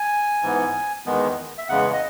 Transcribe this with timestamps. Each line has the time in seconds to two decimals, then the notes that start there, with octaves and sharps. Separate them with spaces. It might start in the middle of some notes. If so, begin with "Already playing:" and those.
Already playing: G#5
0.42 G#2 E3 B3
1.06 E2 D#3 G#3 B3
1.58 E5
1.69 E2 C#3 G#3 B3 F#5
1.93 D#5